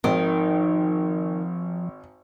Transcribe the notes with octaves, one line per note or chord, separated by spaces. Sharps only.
G#1 D#3 F3